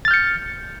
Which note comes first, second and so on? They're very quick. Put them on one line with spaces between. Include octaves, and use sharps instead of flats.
A6 F6 G6 C#7